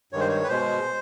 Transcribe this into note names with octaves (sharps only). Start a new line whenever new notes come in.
G2 D#3 G#3 C#5
C5
C#5
B4
B2 G#3 C5